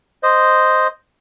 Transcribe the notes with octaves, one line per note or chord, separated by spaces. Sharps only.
C5 D#5